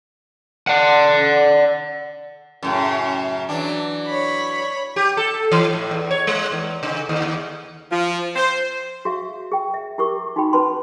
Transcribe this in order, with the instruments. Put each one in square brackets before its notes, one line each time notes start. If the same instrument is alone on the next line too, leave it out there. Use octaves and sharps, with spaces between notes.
[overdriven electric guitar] D5 F#5
[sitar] F#2 A2 C#3
E3 F#3 D4
[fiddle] C#5 B5
[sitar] G4
A4
E3
A2
E2
C#5
G#3
E2
C#3
D#2
[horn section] F3
C5
[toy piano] F#4 G#4 E5 F5
G#4 G5
E5
E4 G4 A#4 C#6 D6
D#4 F#4 G#4 G5 B5
C#4 F#4 B4 A5 B5 C6